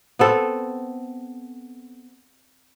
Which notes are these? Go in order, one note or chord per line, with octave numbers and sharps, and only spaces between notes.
B3 C4 A4